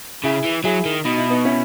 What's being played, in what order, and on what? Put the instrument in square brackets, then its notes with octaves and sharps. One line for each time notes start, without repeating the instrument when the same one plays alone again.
[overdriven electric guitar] C#3 [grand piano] E4 G#4
[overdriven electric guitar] E3
[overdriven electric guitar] F#3 [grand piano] E4 G#4
[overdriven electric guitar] D#3
[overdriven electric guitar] B2 [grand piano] D#4
[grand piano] E4
B3 D#4
C#4 E4